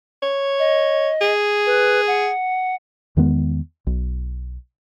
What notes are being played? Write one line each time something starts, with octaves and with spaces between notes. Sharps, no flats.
C#5
D#5
G#4
B4
F#5
E2 D#3 G#3 B3
B1